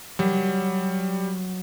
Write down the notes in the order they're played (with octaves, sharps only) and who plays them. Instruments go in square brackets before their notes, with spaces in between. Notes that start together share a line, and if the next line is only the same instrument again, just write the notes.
[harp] F#3 [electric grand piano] G3